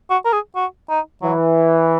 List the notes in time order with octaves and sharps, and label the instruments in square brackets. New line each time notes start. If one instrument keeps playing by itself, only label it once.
[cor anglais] F#4
A#4
G#4
F#4
D#4
[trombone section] E3 [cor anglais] F#3